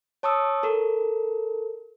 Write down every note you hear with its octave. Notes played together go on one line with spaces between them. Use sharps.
C#5 A5 C#6 D#6 E6
A4 A#4